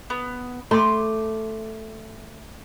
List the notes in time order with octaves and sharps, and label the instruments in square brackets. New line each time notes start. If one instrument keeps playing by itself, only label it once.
[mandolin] B3
[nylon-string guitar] A3 [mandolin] C6 D6